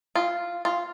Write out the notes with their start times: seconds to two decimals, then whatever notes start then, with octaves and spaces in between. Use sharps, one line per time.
0.15 F4
0.65 F4